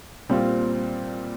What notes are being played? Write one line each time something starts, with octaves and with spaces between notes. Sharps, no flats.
A#2 G3 C4 F4